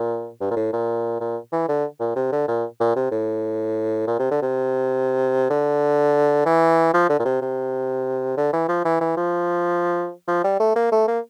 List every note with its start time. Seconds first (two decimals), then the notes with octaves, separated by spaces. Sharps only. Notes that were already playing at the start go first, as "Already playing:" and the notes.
Already playing: A#2
0.41 G2
0.51 A#2
0.56 A2
0.73 A#2
1.20 A#2
1.52 E3
1.68 D3
2.00 A#2
2.16 C3
2.32 D3
2.48 A#2
2.80 A#2
2.96 C3
3.11 A2
4.07 A#2
4.19 C3
4.31 D3
4.42 C3
5.50 D3
6.46 E3
6.93 F3
7.09 D3
7.19 A#2
7.25 C3
7.41 C3
8.37 D3
8.53 E3
8.68 F3
8.85 E3
9.01 E3
9.17 F3
10.28 F3
10.44 G3
10.60 A3
10.76 A#3
10.92 A3
11.08 A#3